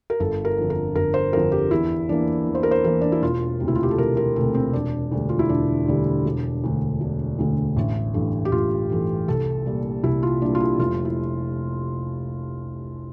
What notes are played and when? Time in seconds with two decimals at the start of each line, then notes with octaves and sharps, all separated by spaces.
0.10 A#4
0.20 G1 A4
0.45 A#4
0.57 F2 D3
0.70 A#4
0.95 G1 A#4
1.14 C5
1.33 F2 D3 A#4
1.52 G4
1.71 E2 E4
2.09 E3 A#3 D4
2.46 E2
2.55 C5
2.63 A#4
2.71 C5
2.84 E3 A#3 A#4
3.01 D4
3.12 E4
3.22 E1 F4
3.60 D2 C3
3.68 E4
3.75 F4
3.83 G4
3.91 A4
3.98 E1 A#4
4.17 A#4
4.36 D2 C3 A4
4.55 C4
4.73 E1 D4
5.12 D2 D3 G3
5.29 F4
5.39 E4
5.49 E1 D4
5.87 D2 D3 G3
6.25 E1
6.64 D2 D3
7.01 E1
7.39 D2 D3
7.77 A1
8.14 G2 E3 A3
8.45 G4
8.52 A1 F4
8.90 G2 E3 A3
9.28 C2 A4
9.66 A#2 G3
10.03 C2 E4
10.23 F4
10.41 A#2 G3 D4
10.55 F4
10.60 E4
10.79 F1 F4
11.05 E4